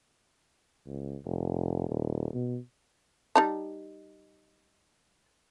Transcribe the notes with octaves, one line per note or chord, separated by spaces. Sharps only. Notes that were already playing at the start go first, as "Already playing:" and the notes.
C#2
F1
D#1
B2
G3 D#4 A5